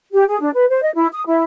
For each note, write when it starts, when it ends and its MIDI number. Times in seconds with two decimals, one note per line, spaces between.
0.13 0.24 67
0.29 0.37 68
0.40 0.49 62
0.54 0.67 71
0.70 0.82 72
0.82 0.90 75
0.95 1.08 64
1.13 1.22 87
1.26 1.43 64